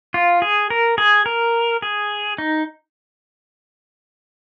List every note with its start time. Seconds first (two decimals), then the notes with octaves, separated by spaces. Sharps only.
0.14 F4
0.42 G#4
0.70 A#4
0.98 G#4
1.26 A#4
1.82 G#4
2.38 D#4